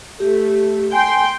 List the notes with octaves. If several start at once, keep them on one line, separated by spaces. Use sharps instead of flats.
A3 G4
G5 G#5 C6